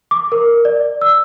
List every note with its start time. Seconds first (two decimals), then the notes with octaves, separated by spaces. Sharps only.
0.11 D6
0.32 A#4
0.65 D5
1.01 E6